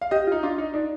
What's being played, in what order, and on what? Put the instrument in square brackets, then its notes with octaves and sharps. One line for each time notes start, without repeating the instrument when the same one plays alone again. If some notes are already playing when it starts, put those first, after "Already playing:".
[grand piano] F5
[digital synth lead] G4 [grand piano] D#5
[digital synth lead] F4
[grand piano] D#4
[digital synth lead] D4 [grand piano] F4
[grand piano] D#4
[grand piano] D4 [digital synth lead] D#4